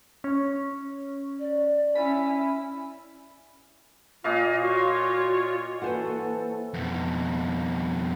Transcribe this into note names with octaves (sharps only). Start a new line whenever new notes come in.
C#4
D5
C#4 E4 B5
A#2 F4 D#5 F5
F4 F#4 C#5
E3 A#3 E4 A4 B4 C5 F#5
F2 B2